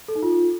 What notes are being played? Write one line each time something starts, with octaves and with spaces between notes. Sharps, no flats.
A4
D#4
F4